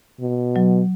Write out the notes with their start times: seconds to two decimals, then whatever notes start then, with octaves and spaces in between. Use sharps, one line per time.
0.20 B2
0.56 F#3